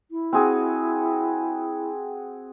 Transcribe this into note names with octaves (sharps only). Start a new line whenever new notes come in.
E4
C4 F#4 G#4